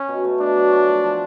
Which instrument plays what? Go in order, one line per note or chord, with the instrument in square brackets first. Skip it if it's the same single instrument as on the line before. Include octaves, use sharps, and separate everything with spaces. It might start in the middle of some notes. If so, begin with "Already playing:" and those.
Already playing: [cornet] C#4
[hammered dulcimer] B2
A3
[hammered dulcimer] B2 [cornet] D4
[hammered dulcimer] F#3
A3
F3
F3